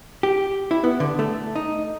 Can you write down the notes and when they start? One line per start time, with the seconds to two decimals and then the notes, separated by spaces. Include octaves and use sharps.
0.23 G4
0.71 E4
0.84 B3
1.00 D3
1.19 A3
1.55 D#4